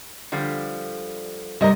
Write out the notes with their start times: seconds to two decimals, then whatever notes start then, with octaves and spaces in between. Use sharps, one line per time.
0.32 D3 F3 G3
1.61 C3 G3 A#4 D#5